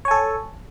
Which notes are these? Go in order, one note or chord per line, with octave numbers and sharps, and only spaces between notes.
A4 C#5 G#5